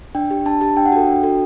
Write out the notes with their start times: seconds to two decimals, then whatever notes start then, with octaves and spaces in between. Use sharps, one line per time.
0.15 D4 G5
0.31 G4
0.46 D4 A5
0.61 G4 A5
0.76 D4 G5
0.86 F#5
0.92 F#4 A4 G5
1.08 D4
1.23 F#4 A4